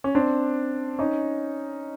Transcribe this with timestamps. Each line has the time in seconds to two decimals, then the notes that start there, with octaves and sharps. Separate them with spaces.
0.04 C#4
0.15 C4 D4
0.99 C#4 D#4